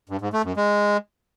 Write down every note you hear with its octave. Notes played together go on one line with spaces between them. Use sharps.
G2
G#2
A3
F#2
G#3